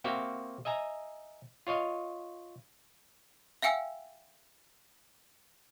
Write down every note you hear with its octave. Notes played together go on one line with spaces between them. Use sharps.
A#3 C4 F#4 G4 E5 F5
D#5 E5 G#5 A#5
F4 C#5 D#5 F5
E5 F5 G5 G#5 E6